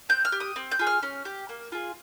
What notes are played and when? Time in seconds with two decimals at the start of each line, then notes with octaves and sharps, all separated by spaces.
0.09 C4 G6
0.25 F6
0.32 G4
0.40 D#6
0.56 C4
0.71 G6
0.79 F4 G#4
0.87 F6
1.03 C#4
1.25 G4
1.49 A#3
1.72 F4 G#4